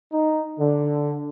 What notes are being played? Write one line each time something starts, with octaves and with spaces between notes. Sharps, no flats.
D#4
D3